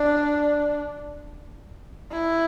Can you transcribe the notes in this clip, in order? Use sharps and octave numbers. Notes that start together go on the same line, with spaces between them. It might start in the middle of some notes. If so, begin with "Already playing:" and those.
Already playing: D4
E4